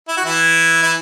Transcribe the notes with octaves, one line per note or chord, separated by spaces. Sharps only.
E4
F#4
E3 E4
E4